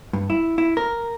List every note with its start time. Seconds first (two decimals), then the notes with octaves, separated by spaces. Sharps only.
0.13 G2
0.30 E4
0.58 E4
0.77 A#4